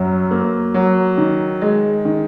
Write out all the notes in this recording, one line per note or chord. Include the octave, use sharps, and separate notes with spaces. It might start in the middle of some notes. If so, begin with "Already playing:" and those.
Already playing: F#2 F#3
A#3
F#3
D#3
G#3
D#3